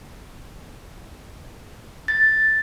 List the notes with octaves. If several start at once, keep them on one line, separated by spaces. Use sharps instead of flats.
A6